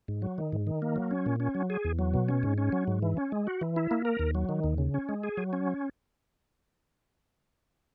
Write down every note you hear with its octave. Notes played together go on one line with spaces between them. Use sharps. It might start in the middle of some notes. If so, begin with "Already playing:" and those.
G#2
F#3
D#3
G#2
D#3
A#3
F#3
C#4
A#2
C#4
F#3
G#4
E2
F#3
B2
C#4
G#2
C#4
F#3
G#2
E3
C#4
G#3
F#4
E3
E4
A#3
A#4
D#2
F#3
D#3
D#2
C#3
C#4
G#3
G#4
F#3
C#4